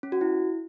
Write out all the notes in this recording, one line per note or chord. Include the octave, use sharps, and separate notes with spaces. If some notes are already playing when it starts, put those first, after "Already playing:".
C#4
F#4
E4